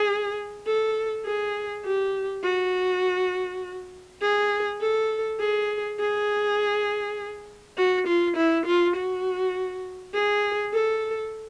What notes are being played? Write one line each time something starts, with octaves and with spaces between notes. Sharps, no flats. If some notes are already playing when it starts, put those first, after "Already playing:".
Already playing: G#4
A4
G#4
G4
F#4
G#4
A4
G#4
G#4
F#4
F4
E4
F4
F#4
G#4
A4